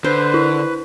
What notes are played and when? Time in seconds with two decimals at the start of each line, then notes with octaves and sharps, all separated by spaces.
0.04 D3 B4 C5
0.34 E4